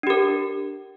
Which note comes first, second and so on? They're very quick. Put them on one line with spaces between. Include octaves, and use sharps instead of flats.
D4 G4 A#4